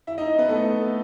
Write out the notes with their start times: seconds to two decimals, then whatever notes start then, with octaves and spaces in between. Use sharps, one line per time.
0.07 E4 E5
0.18 D#4 D#5
0.38 B3 B4
0.49 A3 A4